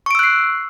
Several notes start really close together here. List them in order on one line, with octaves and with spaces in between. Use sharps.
C#6 D7 E6 F#6 C7